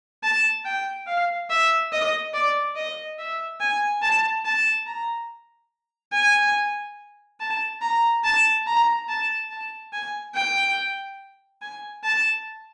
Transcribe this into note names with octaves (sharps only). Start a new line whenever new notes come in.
A5
G5
F5
E5
D#5
D5
D#5
E5
G#5
A5
A5
A#5
G#5
A5
A#5
A5
A#5
A5
A5
G#5
G5
G#5
A5